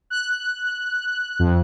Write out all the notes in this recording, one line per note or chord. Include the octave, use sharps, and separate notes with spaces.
F#6
F2